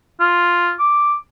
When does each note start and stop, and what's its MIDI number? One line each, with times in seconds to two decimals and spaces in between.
0.20 0.72 65
0.79 1.15 86